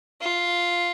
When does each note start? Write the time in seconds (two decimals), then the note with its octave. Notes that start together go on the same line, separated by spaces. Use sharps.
0.21 F4